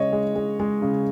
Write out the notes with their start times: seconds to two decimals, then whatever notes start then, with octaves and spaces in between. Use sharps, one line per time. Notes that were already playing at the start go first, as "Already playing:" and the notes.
Already playing: C#3 G#3 C#5 D#5
0.12 G#3
0.35 G#3
0.60 G#3
0.82 C#3